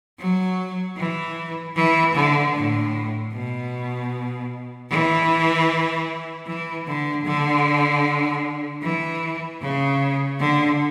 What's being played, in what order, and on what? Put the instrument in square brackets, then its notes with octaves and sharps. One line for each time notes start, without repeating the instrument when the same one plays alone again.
[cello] F#3
E3
E3
D3
A2
B2
E3
E3
D3
D3
E3
C#3
D3